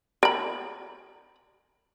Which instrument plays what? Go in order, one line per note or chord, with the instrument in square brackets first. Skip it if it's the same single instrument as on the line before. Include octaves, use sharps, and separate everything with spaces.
[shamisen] A#4 B5